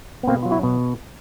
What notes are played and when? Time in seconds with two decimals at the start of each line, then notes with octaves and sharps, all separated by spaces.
0.23 B3
0.27 B2 A#3 C4
0.43 F#3 F4
0.51 E4 F#4
0.63 B2